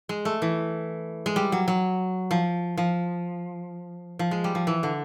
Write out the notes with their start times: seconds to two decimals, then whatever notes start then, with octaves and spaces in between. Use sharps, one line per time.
0.09 G#3
0.25 A3
0.42 E3
1.26 G#3
1.36 G3
1.52 F#3
1.68 F#3
2.31 F3
2.77 F3
4.19 F3
4.31 G#3
4.44 G3
4.55 F3
4.67 E3
4.83 D3